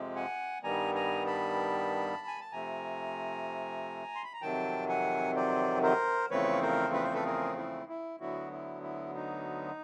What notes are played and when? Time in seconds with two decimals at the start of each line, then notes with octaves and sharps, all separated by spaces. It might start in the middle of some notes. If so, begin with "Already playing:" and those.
Already playing: F2 C3 F3 G#3
0.16 F#5 G#5
0.63 G2 D#3 G3 B3 G#5 A#5
0.95 G#5 A#5
1.26 A5 B5
2.27 G#5
2.40 A5
2.52 C3 F3 A3 G#5 A#5
4.15 C6
4.24 B5
4.33 A#5
4.42 F2 C3 D#3 F#3 G5 A5
4.89 F#5 G#5
5.36 C5 D5
5.83 A#4 C5
6.31 E2 C#3 F3 A3 C4 B4 C#5
6.62 A#4 C5
6.94 B4
7.04 C5
7.14 A4 B4
7.26 G#4 A#4
7.57 E4
7.89 E4
8.20 D2 D3 F#3 B3 E4 F#4
8.52 E4
8.83 E4
9.15 D#4